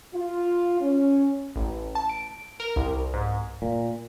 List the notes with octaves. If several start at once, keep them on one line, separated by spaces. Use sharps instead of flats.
F4
C#4
A1
A5
D7
A#4
C2
G#2
A#2